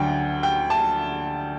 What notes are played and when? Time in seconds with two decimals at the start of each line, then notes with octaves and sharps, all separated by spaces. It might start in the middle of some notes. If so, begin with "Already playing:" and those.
Already playing: D2 D3 F#3 G5
0.43 G5
0.70 A5